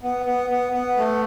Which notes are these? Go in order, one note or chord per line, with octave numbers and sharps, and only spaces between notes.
B3
B3
B3
B3
A3